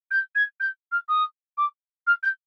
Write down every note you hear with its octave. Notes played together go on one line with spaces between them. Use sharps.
G6
G#6
G6
F6
D#6
D6
F6
G6